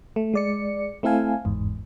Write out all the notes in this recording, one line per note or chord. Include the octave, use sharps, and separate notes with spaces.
A3
G#3 D5 C#7
A3 C4 E4 A4 F5 G#5
G1 E2 G#2